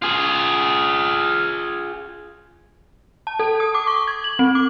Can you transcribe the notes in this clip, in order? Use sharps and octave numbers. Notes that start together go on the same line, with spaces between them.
F4 G#4
A5
A4
D#6
D6
C#6
G#6
F#7
C4
D6